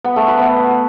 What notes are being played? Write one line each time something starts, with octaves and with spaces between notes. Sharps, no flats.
B3
A3
B4
B3